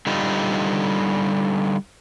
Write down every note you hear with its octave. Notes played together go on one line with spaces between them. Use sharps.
D3 G3 D#4 F4